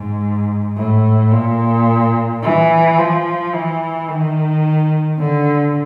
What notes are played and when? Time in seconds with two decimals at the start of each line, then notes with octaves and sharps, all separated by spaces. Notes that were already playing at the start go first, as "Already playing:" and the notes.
Already playing: G#2
0.76 A2
1.31 A#2
2.42 E3
2.98 F3
3.53 E3
4.09 D#3
5.19 D3